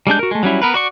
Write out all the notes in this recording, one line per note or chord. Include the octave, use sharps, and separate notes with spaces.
G3 G#3 D4 G6
F#4 A#4
G#3 A3
F#3 G3 C#4 E4
B3 A#4 B4
F#4 D5 C#6